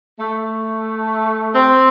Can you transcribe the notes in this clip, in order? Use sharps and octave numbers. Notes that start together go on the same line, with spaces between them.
A3
C4